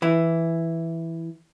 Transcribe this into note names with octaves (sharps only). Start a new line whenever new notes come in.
E3 E4